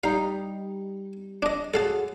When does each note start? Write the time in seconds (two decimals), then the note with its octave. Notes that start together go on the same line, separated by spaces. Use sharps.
0.04 G3 D#4 F5
1.42 D4 D#5
1.74 F#2 F#4 G#4 A4 F5 A5